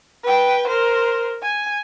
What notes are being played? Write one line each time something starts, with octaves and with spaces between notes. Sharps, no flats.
B4 G5
A#4 C5
G#5